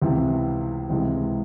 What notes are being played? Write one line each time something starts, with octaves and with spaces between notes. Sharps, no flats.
C#2 C3 E3
C#2 C3 E3 G#3